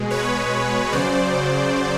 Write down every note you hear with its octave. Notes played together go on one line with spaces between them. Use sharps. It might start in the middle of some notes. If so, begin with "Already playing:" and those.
Already playing: B2 G#3
B4 C#5
C#3 F#3 C5 D5